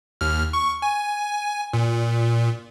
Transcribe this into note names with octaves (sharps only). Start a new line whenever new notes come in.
D#2 F6
C#6
G#5
A#2